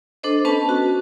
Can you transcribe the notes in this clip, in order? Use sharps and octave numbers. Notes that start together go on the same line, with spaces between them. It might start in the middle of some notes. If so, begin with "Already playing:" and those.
D4 A4 C5 D#5
B3 C#4 B4 A5
F#4